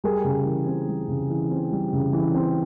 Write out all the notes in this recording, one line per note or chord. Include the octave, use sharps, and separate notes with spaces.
G3 G#4 A#4
C#3
E3
C4
G3
C#3
E3
C4
G3
C#3
E3
C4